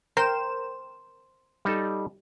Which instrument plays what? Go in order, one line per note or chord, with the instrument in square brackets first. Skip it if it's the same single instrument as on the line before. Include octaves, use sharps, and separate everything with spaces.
[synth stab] A#4 G5 E7 [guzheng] C5
[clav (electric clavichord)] G3 D#4 A4